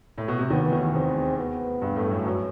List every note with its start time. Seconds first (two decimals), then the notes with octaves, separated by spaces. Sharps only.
0.18 A2
0.28 B2
0.39 C3
0.50 D#2 D#3 B3
0.66 E3
0.72 D#2 D#3
0.94 E2 E3 C4
1.38 B3
1.81 G2 G3
1.96 A2 A3
2.11 F#2 F#3
2.25 F#2 F#3